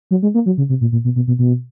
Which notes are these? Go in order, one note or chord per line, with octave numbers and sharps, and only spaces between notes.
F#3
G#3
A#3
F#3
C#3
C3
A#2
A#2
B2
B2
B2
B2